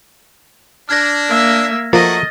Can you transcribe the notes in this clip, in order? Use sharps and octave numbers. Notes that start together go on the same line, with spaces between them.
D4 F6 G#6 A#6
A#3 E5
F3 F#3 A3 A#3 D#5 F#5 A6